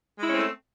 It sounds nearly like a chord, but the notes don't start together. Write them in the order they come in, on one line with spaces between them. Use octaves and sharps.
G#3 E4 C#4 C4 A3